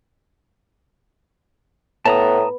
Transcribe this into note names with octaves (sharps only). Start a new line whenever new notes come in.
A2 B3 A5 A#5 D#6